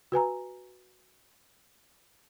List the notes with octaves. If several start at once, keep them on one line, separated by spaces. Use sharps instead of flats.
F#4 B4 G#5 A#5